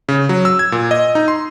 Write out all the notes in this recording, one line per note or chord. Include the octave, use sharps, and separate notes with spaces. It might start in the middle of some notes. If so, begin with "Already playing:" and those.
C#3
F#3
E6
G#6
A#2
D#5
D#4
C6